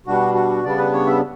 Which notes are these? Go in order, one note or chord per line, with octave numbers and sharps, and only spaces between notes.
B2 G3 D4 F#4
F#4
C#3 G3 B3 D4 D5
B4
C#5
E5